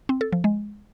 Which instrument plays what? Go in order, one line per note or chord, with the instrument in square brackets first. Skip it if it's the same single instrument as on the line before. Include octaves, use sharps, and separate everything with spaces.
[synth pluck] C4
A4
F3
G#3